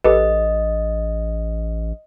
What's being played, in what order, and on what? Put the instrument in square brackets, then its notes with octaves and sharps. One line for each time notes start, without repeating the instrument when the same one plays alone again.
[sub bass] A1 [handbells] G4 A4 B4 [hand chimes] D#5